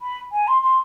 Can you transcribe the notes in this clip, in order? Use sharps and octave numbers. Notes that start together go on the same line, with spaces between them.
B5
G#5
C6
C6